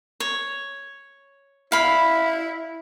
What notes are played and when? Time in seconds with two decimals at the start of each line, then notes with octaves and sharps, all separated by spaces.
0.20 C#5
1.72 E4 F5 B5